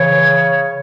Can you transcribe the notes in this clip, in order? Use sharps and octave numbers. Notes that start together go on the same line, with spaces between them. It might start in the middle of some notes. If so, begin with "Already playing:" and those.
Already playing: C#3 E3 C#5